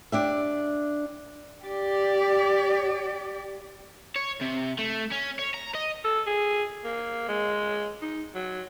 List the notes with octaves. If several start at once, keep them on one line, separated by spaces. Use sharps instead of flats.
D4 G4 E5
G4 D5
C#5
C3
A3
C#4
C#5
A#5
D#5
A4
G#4
A#3
G#3
D#4
F#3